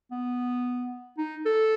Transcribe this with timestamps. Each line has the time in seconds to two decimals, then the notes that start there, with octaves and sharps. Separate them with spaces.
0.11 B3
1.18 D#4
1.46 A4